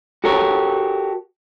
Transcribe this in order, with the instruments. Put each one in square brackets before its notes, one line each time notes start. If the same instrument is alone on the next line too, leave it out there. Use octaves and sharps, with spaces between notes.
[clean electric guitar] F#4 G4 A4 A#4 C#5